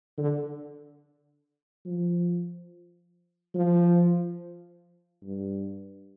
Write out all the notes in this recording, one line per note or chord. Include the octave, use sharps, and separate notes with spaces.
D3
F3
F3
G2